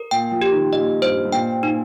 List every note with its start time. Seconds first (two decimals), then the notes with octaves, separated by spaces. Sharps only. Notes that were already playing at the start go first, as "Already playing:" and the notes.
Already playing: A#4
0.11 A#2 G5
0.32 F3
0.41 G4
0.52 D#3
0.73 A#2 D#5
1.02 G2 C5
1.25 G2
1.32 A#2 G5
1.63 A#2 D#4